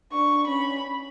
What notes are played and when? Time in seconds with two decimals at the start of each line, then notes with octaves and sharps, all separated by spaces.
0.12 D4 C#6
0.47 C#4 B5